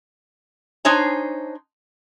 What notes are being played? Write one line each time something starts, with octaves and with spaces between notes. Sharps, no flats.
D4 D#4 C5 C#5 G#5